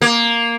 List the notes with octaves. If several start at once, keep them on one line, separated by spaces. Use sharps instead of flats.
A#3